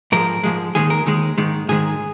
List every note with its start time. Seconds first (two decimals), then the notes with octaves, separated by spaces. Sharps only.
0.12 G#2 F3 G#3 A#4
0.43 G#2 F3 G#3
0.75 D#2 D#3 G#3 G#4
0.90 A#4
1.06 D#2 D#3 G#3
1.38 G#2 D#3 G#3
1.68 G#2 D#3 G#3 G#4